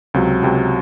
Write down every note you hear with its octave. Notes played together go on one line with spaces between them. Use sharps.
C#2 C3 F#3
C#2 C3 F#3